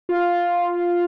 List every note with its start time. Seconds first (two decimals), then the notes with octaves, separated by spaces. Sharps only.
0.09 F4